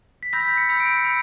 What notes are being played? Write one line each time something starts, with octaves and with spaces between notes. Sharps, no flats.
B6
B5 E6 G6 A#6
B6
C#7
B5 E6 G6 C#7
D7
C#7
B5 E6 G6